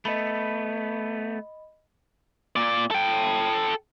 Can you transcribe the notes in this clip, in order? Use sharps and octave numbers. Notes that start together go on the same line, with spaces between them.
A3 B3 D#5 B5
A#2 D5
A4 G5